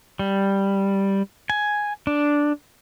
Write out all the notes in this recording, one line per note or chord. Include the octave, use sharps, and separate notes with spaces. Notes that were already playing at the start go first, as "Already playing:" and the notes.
G3
G#5
D4